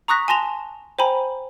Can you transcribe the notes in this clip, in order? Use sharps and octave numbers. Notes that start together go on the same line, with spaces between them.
A#5 C#6 D#6 F#6 A#6 B6
G#5 A5 C6 A#6 E7 F7
C5 G5 G#5 A#5 B5